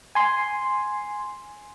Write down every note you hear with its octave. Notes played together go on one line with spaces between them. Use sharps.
G#5 C6